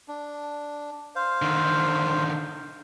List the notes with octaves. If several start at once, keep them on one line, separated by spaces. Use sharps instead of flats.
D4
C5 F5
D3 D#3